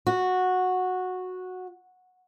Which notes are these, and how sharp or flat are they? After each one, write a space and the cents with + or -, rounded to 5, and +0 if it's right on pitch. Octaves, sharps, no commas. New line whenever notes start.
F#4 -10